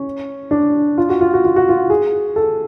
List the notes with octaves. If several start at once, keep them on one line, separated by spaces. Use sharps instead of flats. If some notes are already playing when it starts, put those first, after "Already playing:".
Already playing: C#4
D4
F4
F#4
F4
F#4
F4
F#4
F4
G#4
A4